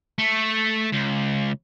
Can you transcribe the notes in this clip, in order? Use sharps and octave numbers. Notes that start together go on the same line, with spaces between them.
A3
C#2